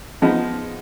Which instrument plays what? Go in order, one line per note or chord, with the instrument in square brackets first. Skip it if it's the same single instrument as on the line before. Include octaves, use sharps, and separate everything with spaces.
[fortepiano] F3 G#3 B3 D#4